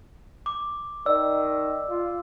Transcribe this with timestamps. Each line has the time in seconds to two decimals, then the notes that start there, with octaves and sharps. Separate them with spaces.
0.46 D6
1.06 D#3 D5 E6
1.89 F4